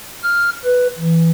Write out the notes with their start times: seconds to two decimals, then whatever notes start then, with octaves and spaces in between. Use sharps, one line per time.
0.23 F6
0.65 B4
0.99 E3